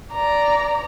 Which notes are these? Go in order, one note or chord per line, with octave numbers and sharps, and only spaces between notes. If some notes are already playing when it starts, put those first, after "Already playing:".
D5 A#5